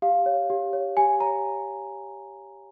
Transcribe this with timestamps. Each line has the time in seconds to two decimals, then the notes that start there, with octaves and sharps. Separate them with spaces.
0.02 G4 F5
0.26 C#5
0.50 G4
0.73 C#5
0.97 G4 G#5
1.20 C#5 A#5